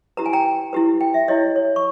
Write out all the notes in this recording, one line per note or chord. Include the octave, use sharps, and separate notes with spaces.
E4 G4 B4 A#5
G#5
G5 A#5
E4 G4 B4
G5
E5
E4 G4 C#5 D#5
C#5
C#6